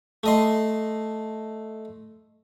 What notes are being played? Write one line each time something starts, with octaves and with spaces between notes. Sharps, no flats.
A3 D#5 C6